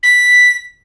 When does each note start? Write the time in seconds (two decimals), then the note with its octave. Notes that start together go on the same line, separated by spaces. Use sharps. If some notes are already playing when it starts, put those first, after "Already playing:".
0.03 B6